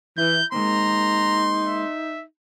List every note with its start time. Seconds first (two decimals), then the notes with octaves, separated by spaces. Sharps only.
0.18 E3 E4 G6
0.52 G#3 A#3 C4 D#4 A#5 C6
1.67 E5